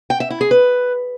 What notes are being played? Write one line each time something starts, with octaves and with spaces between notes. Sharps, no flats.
G5
E5
E4
G#4
B4